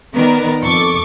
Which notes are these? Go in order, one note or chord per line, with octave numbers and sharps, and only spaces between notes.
D#3 B3 A#4 D5
F2 A4 C#6 D6